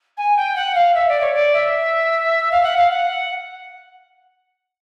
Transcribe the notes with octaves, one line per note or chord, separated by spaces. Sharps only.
G#5
G5
F#5
F5
E5
D5
C#5
D5
E5
F5
F#5
F5
F#5